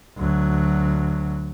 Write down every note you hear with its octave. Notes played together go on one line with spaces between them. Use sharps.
D2 F#3